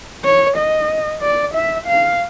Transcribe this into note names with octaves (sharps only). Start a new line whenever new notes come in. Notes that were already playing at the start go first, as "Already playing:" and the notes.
C#5
D#5
D5
E5
F5